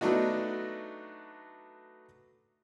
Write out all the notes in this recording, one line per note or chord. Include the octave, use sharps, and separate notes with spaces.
F#3 A3 B3 D4 D#4 F#4